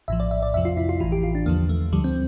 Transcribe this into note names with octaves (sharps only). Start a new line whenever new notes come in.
A#1 A2 F3 E5
D5
E5
D5
F2 C3 F3 E5
F4
E4
F4
A1 A2 E3 F4
G4
F4
D4
E2 D3 F3 A#3
A3
D2 D3 F3 G3
C4